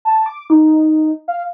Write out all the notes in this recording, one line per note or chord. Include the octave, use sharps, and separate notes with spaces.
A5
D6
D#4
F5